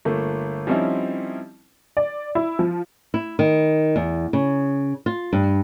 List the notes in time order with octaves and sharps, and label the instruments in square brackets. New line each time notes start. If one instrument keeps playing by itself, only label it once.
[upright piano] G1 A3 A#3
F3 G3 C4 C#4 D#4 E4
[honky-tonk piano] D5
E4
F3
[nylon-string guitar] E4
D#3
E2
C#3
F4
G2